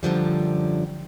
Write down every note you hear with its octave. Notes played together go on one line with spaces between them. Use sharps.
F#2 D3 F3 G3